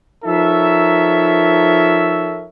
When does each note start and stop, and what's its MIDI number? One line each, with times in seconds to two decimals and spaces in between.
0.25 2.47 53
0.25 2.47 63
0.25 2.47 69
0.25 2.47 70
0.25 2.47 73
0.25 2.47 76